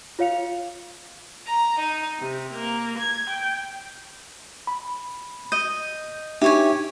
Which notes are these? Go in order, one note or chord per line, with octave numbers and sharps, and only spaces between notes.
F4 C#5 F5 C#7 F7
A#5
D#4
C3
A#3
G#6
G5
B5
D#5 G6
D4 D#4 G4 C#5 E5 G#5